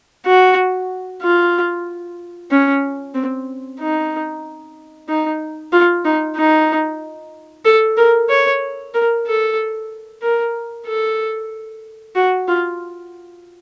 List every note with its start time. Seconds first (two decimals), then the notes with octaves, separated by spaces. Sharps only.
0.26 F#4
1.22 F4
2.51 C#4
3.15 C4
3.80 D#4
5.09 D#4
5.73 F4
6.05 D#4
6.36 D#4
7.65 A4
7.97 A#4
8.29 C#5
8.94 A#4
9.27 A4
10.22 A#4
10.86 A4
12.16 F#4
12.48 F4